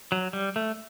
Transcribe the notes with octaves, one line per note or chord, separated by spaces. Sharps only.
F#3
G3
A3